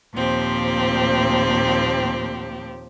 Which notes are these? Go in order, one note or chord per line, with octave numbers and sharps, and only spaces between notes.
D#2 A#2 F3 C4 G4